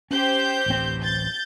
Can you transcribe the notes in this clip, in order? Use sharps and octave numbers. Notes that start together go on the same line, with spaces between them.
C#4 G4 C5 G6
D1 A1 C4
G6 A6